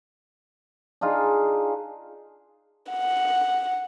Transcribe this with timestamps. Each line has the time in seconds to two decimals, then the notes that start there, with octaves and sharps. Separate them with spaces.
1.01 D4 D#4 F4 G#4
2.91 F#5